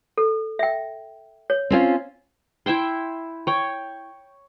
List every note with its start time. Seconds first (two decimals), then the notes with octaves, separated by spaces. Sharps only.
0.17 A4
0.59 E5 G5
1.50 C#5
1.70 C4 C#4 F4
2.66 E4 E5 G5 C6
3.47 C#5 G5